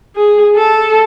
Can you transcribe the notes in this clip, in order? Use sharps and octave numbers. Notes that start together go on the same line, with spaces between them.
G#4
A4